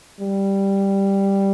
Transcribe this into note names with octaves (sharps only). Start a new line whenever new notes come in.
G3